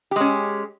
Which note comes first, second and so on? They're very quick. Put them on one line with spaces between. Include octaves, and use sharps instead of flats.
G4 G#3 C#4